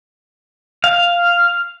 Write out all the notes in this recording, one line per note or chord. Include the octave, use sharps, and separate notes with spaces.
F5